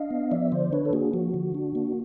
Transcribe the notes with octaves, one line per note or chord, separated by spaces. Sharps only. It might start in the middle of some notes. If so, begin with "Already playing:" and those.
Already playing: D4 D#5 F5
B3
F3 D5 E5
D3 C5 D5
D4 B4 C#5
A4
A#3 F#4 G#4
F3 F#4
D3
D4
A#3